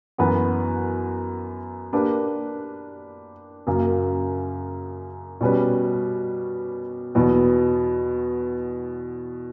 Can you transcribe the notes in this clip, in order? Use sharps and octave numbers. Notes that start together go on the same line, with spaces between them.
F#2 E3 B3 F#4 B4
A#3 D4 G4 B4
F#2 C#3 F#3 A#3
B2 G3 C#4 G4 B4
E2 B2 F#3 B3